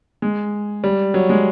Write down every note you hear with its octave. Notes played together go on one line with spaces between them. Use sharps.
G#3
G3
F#3
G#3